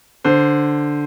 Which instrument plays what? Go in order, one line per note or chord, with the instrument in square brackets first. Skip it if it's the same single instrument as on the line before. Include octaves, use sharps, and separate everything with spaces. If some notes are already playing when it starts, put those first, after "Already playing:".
[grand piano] D3 C5